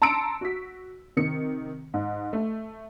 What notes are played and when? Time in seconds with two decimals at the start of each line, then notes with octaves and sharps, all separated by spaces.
0.02 A5 A#5 C6 E6 C#7 D7
0.41 F#4 B6
1.17 C3 D#3 C#7
1.94 G#2
2.33 A3